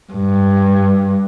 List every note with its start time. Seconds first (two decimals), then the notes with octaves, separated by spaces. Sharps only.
0.12 G2